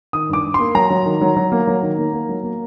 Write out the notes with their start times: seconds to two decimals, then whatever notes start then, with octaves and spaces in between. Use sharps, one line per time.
0.13 D#3 D#6
0.29 G2 D6
0.44 G2
0.54 C6
0.59 A#3
0.75 F#3 A#5
0.90 F#3
1.06 D#3
1.21 F#3
1.36 F#3
1.52 A#3
1.67 F#3
1.83 D#3
1.98 A#3
2.13 A#3
2.29 F#3
2.44 A#3